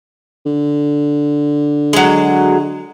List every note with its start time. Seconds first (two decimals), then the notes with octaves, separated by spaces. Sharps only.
0.46 D3
1.93 F#3 G#3